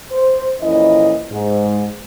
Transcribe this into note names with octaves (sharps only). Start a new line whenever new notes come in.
C5
F2 A#2 E3 C#4 E4 D#5
G#2